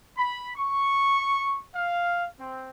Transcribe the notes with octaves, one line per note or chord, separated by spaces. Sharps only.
B5
C#6
F5
C4